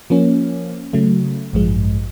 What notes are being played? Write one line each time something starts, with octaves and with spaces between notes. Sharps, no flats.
F3 A#3 C#4
C#3 F#3 A3
A1 G2 F3 G#3